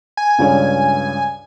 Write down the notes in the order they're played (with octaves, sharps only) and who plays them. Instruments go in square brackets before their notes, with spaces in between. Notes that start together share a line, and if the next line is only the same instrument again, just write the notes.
[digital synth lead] G#5
[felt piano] C#2 G2 C#4